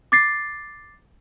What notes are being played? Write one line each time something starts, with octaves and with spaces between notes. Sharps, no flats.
D6 A6 C7